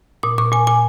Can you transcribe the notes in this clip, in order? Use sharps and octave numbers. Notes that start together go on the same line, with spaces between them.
A#2 D#6
A#2 C#6
A#2 G#5
A#2 G#5